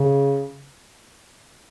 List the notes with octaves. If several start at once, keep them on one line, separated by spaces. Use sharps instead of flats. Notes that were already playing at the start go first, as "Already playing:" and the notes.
Already playing: C#3